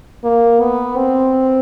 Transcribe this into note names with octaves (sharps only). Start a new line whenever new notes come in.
A#3
B3
C4